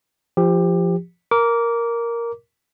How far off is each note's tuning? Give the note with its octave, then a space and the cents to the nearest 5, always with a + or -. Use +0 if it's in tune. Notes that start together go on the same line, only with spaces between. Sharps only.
F3 -15 G4 +20
A#4 +0 D6 -20